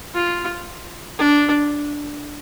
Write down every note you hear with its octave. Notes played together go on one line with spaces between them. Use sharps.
F4
D4